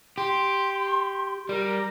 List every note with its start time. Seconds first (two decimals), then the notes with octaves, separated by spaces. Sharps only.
0.18 G4 C6
1.49 G3 A#4